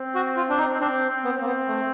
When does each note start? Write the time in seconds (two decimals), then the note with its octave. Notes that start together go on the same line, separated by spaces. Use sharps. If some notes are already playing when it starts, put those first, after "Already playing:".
Already playing: C4
0.15 F#4
0.37 F4
0.49 D4
0.59 D#4
0.81 C4 D4
1.09 C4
1.24 B3
1.38 A#3 C4
1.46 B3
1.68 A3